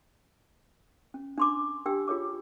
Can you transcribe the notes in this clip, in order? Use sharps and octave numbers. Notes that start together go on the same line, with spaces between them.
C#4
D4 C6 D6
D4 G4 G5 E6
F4 G#4 C#5 D6